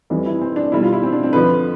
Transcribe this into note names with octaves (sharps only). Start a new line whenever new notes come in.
F2 E3 G3
E4
C4
D4
B2 G3 E4
F4
E4
C4
D4
C4
F2 D3 F3 B4